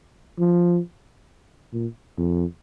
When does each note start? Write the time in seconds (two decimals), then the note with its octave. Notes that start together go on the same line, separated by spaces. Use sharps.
0.39 F3
1.73 A#2
2.18 F2